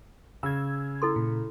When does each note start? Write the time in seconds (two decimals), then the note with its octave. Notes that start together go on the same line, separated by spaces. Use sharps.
0.43 C#3 E6 G#6
1.02 E4 A4 C6
1.16 A#2